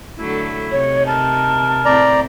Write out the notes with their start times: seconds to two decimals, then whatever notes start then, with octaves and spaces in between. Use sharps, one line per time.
0.19 D3 F#3 A3 E4
0.71 C3 D#4 C#5
1.06 A#4 A5
1.85 A2 C4 E4 D5 A#5